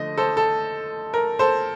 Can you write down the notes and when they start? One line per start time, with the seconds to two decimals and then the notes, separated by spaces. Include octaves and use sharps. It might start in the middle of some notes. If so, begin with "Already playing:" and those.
Already playing: D3 F3 A3 D#5
0.18 A4 C5
0.37 A4
1.14 A#4
1.39 A4 C5